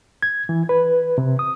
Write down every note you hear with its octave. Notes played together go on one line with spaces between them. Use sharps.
G#6
E3
B4
C3
D#6